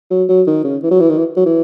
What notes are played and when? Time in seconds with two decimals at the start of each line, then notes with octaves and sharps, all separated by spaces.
0.11 F#3
0.29 F#3
0.47 D#3
0.64 C#3
0.83 E3
0.91 F#3
1.00 E3
1.09 D#3
1.18 E3
1.37 F#3
1.46 E3